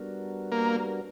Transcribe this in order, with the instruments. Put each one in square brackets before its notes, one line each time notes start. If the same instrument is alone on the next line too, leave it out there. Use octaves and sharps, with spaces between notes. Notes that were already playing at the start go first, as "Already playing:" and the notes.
Already playing: [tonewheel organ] G3 B3 D4 F#4 A#4
[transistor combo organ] A#3